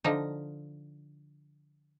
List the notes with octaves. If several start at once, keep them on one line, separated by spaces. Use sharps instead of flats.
D3 F3 D#4